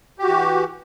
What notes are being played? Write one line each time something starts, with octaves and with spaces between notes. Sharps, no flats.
E3 F#4 G4